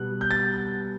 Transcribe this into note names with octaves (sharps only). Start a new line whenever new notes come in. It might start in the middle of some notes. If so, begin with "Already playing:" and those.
Already playing: B2 G3 B3 F#6
G6
A6